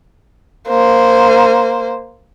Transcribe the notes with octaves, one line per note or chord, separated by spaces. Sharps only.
A#3 C5